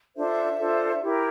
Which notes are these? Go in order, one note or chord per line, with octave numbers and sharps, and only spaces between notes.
D4 F4 A4 C5 E5
D4 F4 A4 C5
E4 G4 A#4